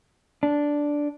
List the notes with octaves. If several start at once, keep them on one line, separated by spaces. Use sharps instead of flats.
D4